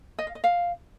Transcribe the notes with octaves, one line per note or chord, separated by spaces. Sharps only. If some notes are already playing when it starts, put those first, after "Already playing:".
D#5
F5
D#5
F5